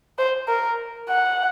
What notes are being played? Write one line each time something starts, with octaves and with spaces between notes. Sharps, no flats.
C5
A#4
F#5